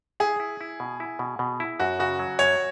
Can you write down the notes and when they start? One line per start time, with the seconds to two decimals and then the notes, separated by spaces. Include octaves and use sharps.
0.20 E4 G#4
0.40 E4
0.61 E4
0.80 B2
1.00 E4
1.19 B2
1.39 B2
1.60 E4
1.80 F#2 F#4
2.00 C#3 F#4
2.19 F#3
2.39 F#2 C#5